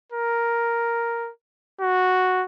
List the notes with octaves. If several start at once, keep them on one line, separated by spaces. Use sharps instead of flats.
A#4
F#4